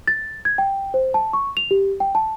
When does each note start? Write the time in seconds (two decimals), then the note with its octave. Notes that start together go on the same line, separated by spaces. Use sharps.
0.08 A6
0.45 G#6
0.58 G5
0.94 C5
1.14 A5
1.33 C#6
1.57 F7
1.71 G4
2.00 G5
2.15 A5